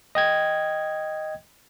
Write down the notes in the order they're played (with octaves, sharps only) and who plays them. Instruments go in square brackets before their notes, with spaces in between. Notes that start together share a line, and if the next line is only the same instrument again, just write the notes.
[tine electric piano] D#5 G5 G#6